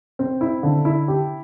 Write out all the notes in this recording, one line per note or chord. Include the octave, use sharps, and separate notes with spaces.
C4
E4
D3
E4
G4